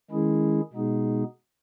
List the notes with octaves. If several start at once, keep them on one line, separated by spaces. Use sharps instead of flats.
D#3 G#3 C#4 E4 G#4
B2 G#3 B3 D#4 G#4